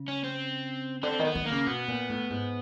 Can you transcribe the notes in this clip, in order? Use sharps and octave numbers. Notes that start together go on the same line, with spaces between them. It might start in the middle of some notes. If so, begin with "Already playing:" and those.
Already playing: C#3
C#4
C4
D3 C4
D#3 B3
D#3
A#3
C#3
B2 B3
A#2
A2
G#2